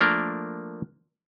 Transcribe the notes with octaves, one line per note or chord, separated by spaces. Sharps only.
F3 A3 A#3 D4 A#4